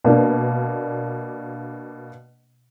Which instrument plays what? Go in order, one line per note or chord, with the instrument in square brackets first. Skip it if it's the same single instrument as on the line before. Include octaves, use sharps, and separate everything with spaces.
[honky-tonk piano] B2 A#3 D4